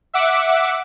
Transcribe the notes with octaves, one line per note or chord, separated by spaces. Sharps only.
E5 F#5 D6